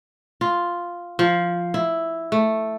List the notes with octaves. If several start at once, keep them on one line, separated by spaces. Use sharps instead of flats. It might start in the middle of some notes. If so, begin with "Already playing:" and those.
F4
F3
E4
A3